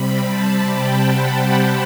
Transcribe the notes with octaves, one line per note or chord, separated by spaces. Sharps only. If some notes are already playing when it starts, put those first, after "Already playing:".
Already playing: C3 G3 C4 B5
A5
G5
F#5